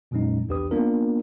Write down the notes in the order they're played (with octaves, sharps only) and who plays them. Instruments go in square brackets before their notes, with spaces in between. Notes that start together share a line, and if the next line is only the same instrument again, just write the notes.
[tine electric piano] F2 A#2 F#3 G#3 C#4 D#4
B1 E2 D4 G4 B4 D#6
A#3 B3 D4 F4 A#4